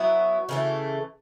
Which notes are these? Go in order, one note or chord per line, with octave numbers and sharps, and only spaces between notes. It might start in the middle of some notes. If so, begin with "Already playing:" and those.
Already playing: F#3 B3 E4 F#4
C#3 E3 A3